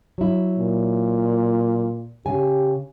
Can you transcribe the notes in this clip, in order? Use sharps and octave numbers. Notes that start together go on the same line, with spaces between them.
F#3 E4
A#2
C#3 G4 G#5